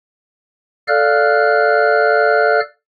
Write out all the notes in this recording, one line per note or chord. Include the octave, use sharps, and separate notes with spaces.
A4 D5 F5 F6 F#6